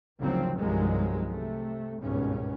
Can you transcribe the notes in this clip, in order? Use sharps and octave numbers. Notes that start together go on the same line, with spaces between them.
G#1 D2 C#3 F3 F#3 C4
C2 G2 D#3 F3 F#3 G#3
C3 A3
G#1 C#2 G2 B2 C#4